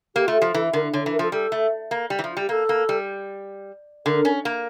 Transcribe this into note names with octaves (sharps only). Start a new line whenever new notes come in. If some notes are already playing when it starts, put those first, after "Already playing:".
A#3 G4
A3 F4
G4
F3
E3 A4
D3 A#4
D3 C#5
E3
A#4
F3 A4
G3 A4
A3
A#3
G3
E3
F3
F4
G3 G4
A#3 A4
A#3
G3
D3 A#4
C#4
A#3